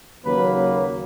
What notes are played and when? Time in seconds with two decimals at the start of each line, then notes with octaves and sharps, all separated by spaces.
0.25 D#2 C#3 F#3 A#3 B4